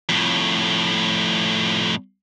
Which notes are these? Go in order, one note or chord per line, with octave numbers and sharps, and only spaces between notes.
F2 A2